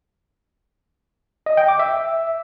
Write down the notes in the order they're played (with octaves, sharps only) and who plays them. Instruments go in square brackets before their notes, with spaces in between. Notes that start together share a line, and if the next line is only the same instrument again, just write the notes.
[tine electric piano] D#5
G5
D6
E5